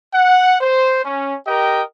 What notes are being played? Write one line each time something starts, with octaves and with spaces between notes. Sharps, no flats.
F#5
C5
C#4
G4 A#4 D#5 G5